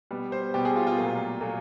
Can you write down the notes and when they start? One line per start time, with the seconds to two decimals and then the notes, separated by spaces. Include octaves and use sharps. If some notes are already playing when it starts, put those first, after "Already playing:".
0.11 B2 G3 B3
0.32 C5
0.54 B2 G3 B3 G4
0.65 G#4
0.76 F4
0.87 F4
0.98 A#2 F#3 A3
1.41 A#2 F#3 A3